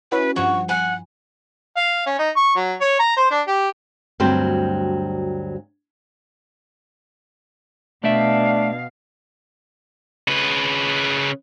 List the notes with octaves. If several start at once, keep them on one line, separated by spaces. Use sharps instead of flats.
C#4 E4 F#4 B4
G2 F3 F#4 C#6
F#5 G#5
F5
C#4
D#4
C#6
F#3
C#5
A#5
C5
D4
G4
D2 G2 F#3 C4 G4 C5
B2 A3 D4 D5 E5 F5
C#3 B4